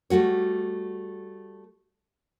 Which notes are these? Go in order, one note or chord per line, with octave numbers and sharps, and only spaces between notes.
G3 A3 F#4 C#5